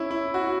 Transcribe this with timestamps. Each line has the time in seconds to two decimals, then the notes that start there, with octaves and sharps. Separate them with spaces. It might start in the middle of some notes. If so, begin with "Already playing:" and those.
Already playing: C#4 E4
0.11 E4
0.34 F#4